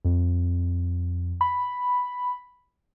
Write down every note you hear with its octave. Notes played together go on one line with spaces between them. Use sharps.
F2
B5